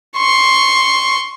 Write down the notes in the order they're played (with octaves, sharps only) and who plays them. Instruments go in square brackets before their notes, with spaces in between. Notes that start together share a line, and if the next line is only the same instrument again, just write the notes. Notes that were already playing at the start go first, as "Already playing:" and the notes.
[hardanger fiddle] C6 C#6